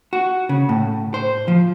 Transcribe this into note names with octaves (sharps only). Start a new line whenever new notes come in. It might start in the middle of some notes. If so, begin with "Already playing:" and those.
F#4
C#3
A2
C5
F3